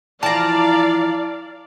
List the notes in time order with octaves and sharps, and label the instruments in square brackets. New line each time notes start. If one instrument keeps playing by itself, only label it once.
[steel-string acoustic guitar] E3 F3 [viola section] D5 F5 [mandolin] A5 A#5